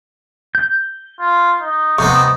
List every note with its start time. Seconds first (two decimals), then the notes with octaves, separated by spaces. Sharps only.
0.55 G6
1.20 F4
1.60 D#4
1.99 C3 B3 D#4 C#6